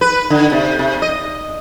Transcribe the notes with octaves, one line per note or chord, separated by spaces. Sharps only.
B4
D3
C3
C3
D#5